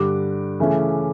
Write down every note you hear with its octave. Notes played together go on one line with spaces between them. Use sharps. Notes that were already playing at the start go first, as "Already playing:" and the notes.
Already playing: G2 D3 G3 D6
C#3 E3 A3 C#4 E4